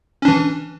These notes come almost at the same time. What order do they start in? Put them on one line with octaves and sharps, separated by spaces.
C#4 D4 E3